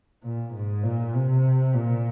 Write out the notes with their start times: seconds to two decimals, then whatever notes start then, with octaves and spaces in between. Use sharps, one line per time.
0.24 A#2
0.54 G#2
0.84 A#2
1.14 C3
1.74 A#2